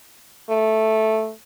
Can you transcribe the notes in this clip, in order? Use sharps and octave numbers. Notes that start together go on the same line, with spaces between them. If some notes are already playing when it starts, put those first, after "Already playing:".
A3